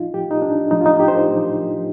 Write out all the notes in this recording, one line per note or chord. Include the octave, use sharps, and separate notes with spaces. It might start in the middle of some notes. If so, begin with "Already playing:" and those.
Already playing: A2 F3 D#4 F4
A2 F3 G4
D#4
D4
A2 F3 D#4
F4
D#4
G4
C5
A#4
A2 F3